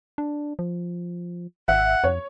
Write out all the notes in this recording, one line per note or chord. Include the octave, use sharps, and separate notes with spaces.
D4
F3
G#1 E5 F#5
F2 C#5